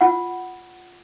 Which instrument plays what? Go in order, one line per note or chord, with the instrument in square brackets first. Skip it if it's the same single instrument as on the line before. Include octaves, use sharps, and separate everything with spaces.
[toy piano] F4 F#5